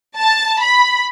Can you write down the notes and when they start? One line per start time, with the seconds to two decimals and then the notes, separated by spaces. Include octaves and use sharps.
0.18 A5
0.62 B5